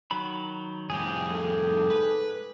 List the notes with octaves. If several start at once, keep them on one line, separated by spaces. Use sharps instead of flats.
D#3 F#3 B5
F2 A2 G4 G#4
G#2 A4
B4